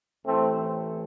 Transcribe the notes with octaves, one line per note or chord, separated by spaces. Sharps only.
A1 A2 E3 A3 C4